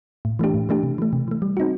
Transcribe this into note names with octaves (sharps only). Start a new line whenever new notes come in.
A2
E3 A3 D4 G4
A2
E3 A3 D4 G4
C3
E3 A3
C3
E3 A3
G3
C4 D#4 F#4